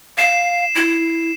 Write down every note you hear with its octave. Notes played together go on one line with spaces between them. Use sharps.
F5 C7 E7
E4